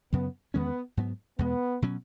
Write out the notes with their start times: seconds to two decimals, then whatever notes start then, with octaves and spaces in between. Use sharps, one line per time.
0.13 F#2 C#3 F#3 B3
0.54 E2 D#3 G#3 B3 C#4
0.97 G#2 F#3 B3
1.39 E2 B2 G#3 B3
1.82 B2 F#3 C#4